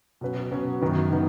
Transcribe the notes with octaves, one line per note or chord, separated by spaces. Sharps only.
B2 F#3 C#4 B4
B2 F#3 C#4 B4
F#2 D#3 B3 D#4
D#3 B3 D#4